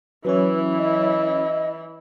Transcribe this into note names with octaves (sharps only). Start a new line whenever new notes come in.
E3 F#3 C#4 E4 B4 C#5
D#5